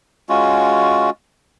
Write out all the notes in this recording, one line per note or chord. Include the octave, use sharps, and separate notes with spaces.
G#3 C#4 F4 F#4